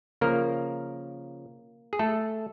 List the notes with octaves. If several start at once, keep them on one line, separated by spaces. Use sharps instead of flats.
C#3 F3 A#3 A#4
G#4
A3 A4